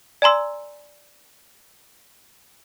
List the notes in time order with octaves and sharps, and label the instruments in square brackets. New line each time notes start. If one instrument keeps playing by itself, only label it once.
[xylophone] D5 G#5 A#5 C6 E6